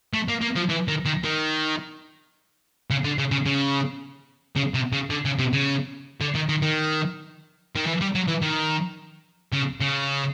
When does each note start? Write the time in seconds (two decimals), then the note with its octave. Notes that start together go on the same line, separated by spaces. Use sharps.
0.14 A3
0.28 A#3
0.41 A#3
0.56 F3
0.69 E3
0.88 D#3
1.06 D#3
1.24 D#3
2.90 C#3
3.04 D3
3.18 C#3
3.31 C#3
3.46 C#3
4.56 C#3
4.74 C3
4.93 C#3
5.10 D3
5.25 C#3
5.39 C3
5.53 C#3
6.21 D3
6.35 D#3
6.49 D#3
6.62 D#3
7.75 D#3
7.86 E3
8.01 G3
8.15 F#3
8.28 E3
8.43 D#3
9.53 C#3
9.80 C#3